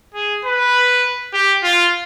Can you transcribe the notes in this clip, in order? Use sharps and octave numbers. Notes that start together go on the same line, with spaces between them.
G#4
B4
G4
F4